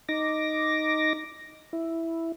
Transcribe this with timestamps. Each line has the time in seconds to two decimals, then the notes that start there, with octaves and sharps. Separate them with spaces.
0.09 D#4 D6 A#6
1.73 E4